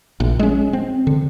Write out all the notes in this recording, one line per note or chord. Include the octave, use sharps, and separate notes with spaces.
A#1
G#3 C#4
C4
D3